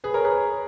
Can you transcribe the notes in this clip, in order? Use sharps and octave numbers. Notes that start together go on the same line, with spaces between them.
G#4 B4
A#4 C#5
G#4 B4